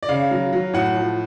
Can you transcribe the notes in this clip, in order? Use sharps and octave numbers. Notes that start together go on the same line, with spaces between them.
D5
C#3 F5
F#3
F#3
A2 F#5
F3